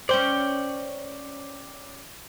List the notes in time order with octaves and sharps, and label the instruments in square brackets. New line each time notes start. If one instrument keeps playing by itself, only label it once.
[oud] C#4 C5 [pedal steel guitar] D5 G5